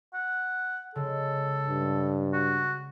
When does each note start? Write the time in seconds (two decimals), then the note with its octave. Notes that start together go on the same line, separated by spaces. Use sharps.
0.14 F#5
0.96 C#3 G#3 A4
1.68 G2
2.33 F#4